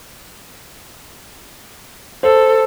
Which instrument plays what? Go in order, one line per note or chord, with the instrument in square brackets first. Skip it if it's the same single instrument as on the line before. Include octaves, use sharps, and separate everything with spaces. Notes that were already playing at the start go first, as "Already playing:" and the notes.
[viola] A4 [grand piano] C5